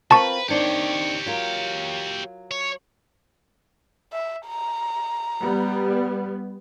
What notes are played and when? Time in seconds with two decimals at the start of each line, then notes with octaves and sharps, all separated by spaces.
0.11 C4 F4 A#4 B4 A5 C#6
0.49 D#3 C4 D4 G4 C#5
1.26 F#3 F4 A#4
2.51 C#5
4.13 E5
4.47 A#5
5.41 G3 B3